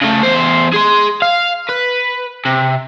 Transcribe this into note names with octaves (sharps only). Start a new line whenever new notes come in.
C#3 A3
E2 C5
G#4 C6
F5
B4
C3